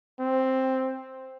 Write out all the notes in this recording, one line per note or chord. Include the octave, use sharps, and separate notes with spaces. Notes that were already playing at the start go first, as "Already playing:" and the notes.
C4